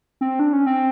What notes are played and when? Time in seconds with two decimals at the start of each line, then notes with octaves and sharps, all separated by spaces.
0.21 C4
0.39 D4
0.53 C#4
0.66 C4